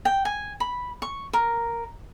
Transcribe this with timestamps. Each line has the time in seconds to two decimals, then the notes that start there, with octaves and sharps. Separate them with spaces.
0.05 G5
0.25 G#5
0.60 B5
1.02 C#6
1.33 A#4